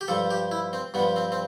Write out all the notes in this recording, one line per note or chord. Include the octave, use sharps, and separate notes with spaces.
G4
G2 F3 A4
G4
E4
C4
G2 F3 B3
C4
C4